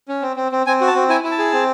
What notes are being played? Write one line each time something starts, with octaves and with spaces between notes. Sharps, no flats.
C#4
C4
C4
C4
C4 G#5
F#4
A5
C4
E4 G#5
E4
A5
G#4
C4